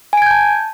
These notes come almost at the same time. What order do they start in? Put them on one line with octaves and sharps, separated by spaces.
G#5 D7 G#6 G6 A5